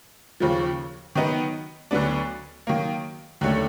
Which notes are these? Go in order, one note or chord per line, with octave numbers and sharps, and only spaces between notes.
D#2 C#3 F3
D#3 F#3 B3 D#4
D2 D3 F#3 B3 D4
D#3 F#3 A#3
D#2 D3 F#3 A3 C#4